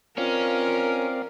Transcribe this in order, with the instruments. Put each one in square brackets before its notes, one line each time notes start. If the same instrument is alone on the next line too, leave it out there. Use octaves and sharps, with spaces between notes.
[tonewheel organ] C4 D5 F5 [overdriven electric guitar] C#4 [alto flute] F4 [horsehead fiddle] A#4